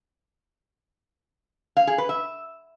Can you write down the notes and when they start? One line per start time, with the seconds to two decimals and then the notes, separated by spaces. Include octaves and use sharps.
1.77 F5
1.87 G#4
1.98 B4
2.09 E5